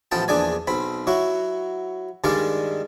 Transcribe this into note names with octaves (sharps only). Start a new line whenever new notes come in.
A1 F3 B3 G5 A5
A#1 E2 D4 G#4 D5 G#5
B1 C4 B5
F#3 E4 F#4
G2 D#3 G3 G#3 D5 F5